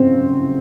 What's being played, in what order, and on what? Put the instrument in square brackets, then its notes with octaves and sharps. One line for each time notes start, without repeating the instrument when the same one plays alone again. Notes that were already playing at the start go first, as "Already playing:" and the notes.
Already playing: [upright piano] C#3 F#3 C4